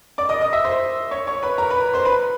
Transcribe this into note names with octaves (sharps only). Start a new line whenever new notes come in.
D5 D6
D#5 D#6
D#5 D#6
E5 E6
C5 C6
C#5 C#6
C#5 C#6
B4 B5
A#4 A#5
B4 B5
C5 C6
B4 B5